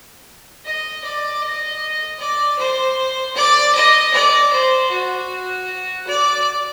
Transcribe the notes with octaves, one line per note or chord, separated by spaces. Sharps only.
D#5
D5
D#5
D5
C5
D5
D#5
D5
C5
F#4
D5